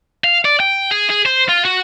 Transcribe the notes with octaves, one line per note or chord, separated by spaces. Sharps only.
F5
D5
G5
G#4
G#4
C5
F4
F#4